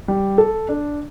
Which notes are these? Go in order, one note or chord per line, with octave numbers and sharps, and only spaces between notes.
G3
A4
D4